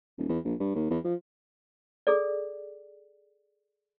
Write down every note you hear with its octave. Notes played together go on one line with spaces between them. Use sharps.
D#1
E2
A#1
G2
D#2
E2
F3
G#4 A4 D5